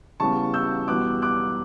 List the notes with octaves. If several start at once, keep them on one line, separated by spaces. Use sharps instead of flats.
C#3 E3 G3 B3 A5 C#6
E6 G6
E2 B2 G3 B3 D6 F#6
D6 F#6